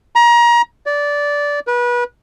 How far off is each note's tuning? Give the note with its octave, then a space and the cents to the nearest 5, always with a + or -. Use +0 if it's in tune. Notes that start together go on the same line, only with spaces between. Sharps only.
A#5 +30
D5 -15
B4 -30